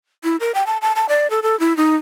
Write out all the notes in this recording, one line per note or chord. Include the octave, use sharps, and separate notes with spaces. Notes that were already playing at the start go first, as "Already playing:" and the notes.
E4
A#4
G5
A5
A5
A5
D5
A4
A4
E4
D#4